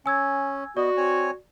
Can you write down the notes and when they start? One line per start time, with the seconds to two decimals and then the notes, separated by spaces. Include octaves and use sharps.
0.06 C#4 G#5 E6 G#6
0.77 B3 F#4 D5 D#5
0.97 C4 C#5 G#5